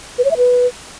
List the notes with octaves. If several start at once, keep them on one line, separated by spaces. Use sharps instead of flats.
B4
C#5
E5
B4